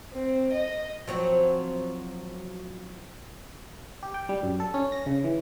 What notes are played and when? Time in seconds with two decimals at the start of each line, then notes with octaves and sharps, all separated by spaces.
0.13 C4
0.52 D#5
1.07 F3 F#3 C4
4.03 G4
4.14 G5
4.29 G3
4.43 F#2
4.60 A4
4.74 C#4
4.92 A#6
5.06 C#3
5.24 E3